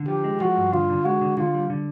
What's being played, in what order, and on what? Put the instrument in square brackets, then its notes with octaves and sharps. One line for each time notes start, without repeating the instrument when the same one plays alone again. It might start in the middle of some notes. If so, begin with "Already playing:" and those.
Already playing: [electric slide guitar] D3
[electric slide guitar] F3 [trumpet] G4
[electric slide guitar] G#3
[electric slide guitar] F3 [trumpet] F#4
[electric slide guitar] G2
[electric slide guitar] D3 [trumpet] F4
[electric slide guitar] D3
[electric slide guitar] G#3 [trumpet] F#4
[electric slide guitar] D3
[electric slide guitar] D3 [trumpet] F4
[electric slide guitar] G3
D3